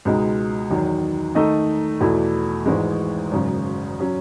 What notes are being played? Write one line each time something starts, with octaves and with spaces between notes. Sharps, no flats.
C#2 B2 G#3 D#4
E2 D#3 F#3
D#3 A3 D#4 A4 D#5
E2 B2 A3 E4
G#1 G#2 E3 G#3
G#1 F#2 C#3
F#3 C#4